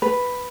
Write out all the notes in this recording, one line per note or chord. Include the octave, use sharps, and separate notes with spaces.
B4